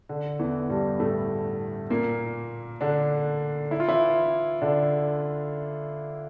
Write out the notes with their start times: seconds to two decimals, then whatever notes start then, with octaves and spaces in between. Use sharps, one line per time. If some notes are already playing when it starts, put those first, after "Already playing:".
0.09 D3
0.39 E2 E3
0.70 G2 G3
0.99 A2 A3
1.90 A#2 A#3
2.81 D3 D4
3.71 E4
3.80 F4
3.88 E3 E4
4.61 D3 D4